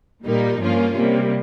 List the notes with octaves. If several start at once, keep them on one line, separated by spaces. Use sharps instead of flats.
A#2 G3 A#3 D#4
G2 F3 A#3 C#4 F4
C3 G3 A#3